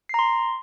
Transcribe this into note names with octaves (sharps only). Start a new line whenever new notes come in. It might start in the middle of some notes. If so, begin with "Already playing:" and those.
A#5 C6 C7